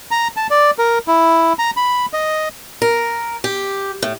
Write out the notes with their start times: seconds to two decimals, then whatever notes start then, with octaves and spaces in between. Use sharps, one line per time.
0.11 A#5
0.37 A5
0.50 D5
0.78 A#4
1.08 E4
1.59 A#5
1.77 B5
2.13 D#5
2.82 A#4
3.44 G4
4.02 A2